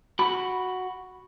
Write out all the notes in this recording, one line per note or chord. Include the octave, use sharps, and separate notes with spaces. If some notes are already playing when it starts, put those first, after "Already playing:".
F#4 B5